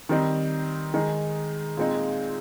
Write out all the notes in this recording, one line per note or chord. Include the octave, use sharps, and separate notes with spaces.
D#3 G3 C4 D#4
D#3 G#3 D#4 G#4
A#2 G#3 C4 D#4